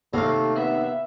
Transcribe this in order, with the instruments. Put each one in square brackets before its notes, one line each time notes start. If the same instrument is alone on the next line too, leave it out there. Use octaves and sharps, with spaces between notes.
[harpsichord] D#2 C3 [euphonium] A3 [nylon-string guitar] A#3 F5
[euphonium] B3 [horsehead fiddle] E5